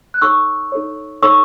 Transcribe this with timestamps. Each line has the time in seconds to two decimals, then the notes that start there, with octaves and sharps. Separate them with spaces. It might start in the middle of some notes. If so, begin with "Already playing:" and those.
0.14 F#6
0.21 D#4 A4 C#5 C#6 E6
0.72 D#4 A4 C#5
1.22 D#4 A4 C#5 C#6 E6